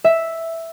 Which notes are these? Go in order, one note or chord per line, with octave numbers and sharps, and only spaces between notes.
E5